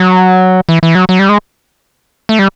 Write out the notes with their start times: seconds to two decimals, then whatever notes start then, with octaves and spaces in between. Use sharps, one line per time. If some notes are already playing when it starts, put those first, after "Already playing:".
Already playing: F#3
0.69 E3
0.83 E3
0.95 F#3
1.09 F#3
1.19 G3
1.29 G#3
2.29 A3
2.39 G3